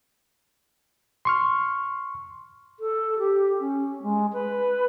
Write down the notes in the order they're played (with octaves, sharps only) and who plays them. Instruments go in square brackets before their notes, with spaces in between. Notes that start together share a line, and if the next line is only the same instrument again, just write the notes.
[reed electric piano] C6 C#6 F6
[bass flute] A4
G4
C#4
G#3
B4